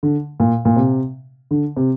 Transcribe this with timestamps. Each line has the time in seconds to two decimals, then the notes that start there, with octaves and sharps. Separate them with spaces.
0.03 D3
0.40 A#2
0.65 A#2
0.76 C3
1.51 D3
1.77 C3